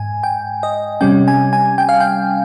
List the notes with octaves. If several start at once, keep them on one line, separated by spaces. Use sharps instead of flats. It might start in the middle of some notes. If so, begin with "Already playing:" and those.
Already playing: G#2 G#5
G5
D#5
C3 G3 C#4 G5
G#5
G#5
G5
F5
G5